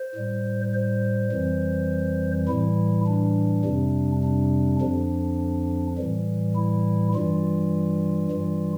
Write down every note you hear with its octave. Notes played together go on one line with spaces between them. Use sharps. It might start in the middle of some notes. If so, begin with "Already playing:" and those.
Already playing: C5
A2 G3
C5
F2 E3 G3
A2 E3 G3 E4
D4
F2 C3 G3
D4
F2 D3 F3 D4
A2 E3 G3
E4
G2 E3 G3 F4
G2 E3 G3